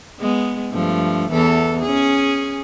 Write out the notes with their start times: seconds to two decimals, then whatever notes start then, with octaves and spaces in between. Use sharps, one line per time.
0.20 G#3 B3
0.72 G2 F3 A3
1.31 E2 E3 A4
1.82 C#4 G#4